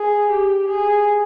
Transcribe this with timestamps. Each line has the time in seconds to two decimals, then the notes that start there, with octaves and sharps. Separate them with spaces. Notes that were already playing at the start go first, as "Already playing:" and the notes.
Already playing: G#4
0.30 G4
0.68 G#4